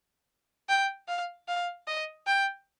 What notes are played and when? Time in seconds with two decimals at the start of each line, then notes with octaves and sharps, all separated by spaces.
0.69 G5
1.08 F5
1.48 F5
1.87 D#5
2.27 G5